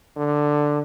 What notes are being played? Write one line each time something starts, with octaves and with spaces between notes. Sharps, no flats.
D3